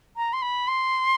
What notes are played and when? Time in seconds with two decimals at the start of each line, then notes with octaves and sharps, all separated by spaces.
0.16 A#5
0.33 C6
0.42 B5
0.67 C6